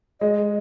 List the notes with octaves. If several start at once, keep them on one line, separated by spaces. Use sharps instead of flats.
G#3 D#5